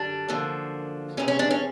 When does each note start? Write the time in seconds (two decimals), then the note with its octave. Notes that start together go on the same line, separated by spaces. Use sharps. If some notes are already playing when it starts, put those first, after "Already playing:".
Already playing: F#2 D3 G3 D4
0.28 F#2 D3 F3 A#3
1.17 E2 C3 F3 C#4
1.28 C#4
1.39 D4
1.51 C#4